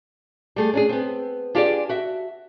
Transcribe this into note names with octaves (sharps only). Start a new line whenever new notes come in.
G3 A3 G#4
C#4 D4 G#4
B3 C4
D4 F4 G4 G#4 C#5 D5
F#4 E5